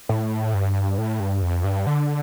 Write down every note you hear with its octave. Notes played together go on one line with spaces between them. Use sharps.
A2
G2
A2
G2
F2
G2
D3